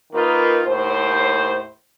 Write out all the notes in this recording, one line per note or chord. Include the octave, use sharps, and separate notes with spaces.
D#3 A#3 D#4 F4 B4
D#2 A2 C5